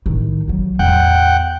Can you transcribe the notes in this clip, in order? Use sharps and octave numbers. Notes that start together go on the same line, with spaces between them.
A2 D#3
F#3 G3
E2 A2 F#5 G5